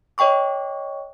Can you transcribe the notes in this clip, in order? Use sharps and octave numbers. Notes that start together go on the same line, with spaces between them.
C#5 D#5 G5 C#6 D6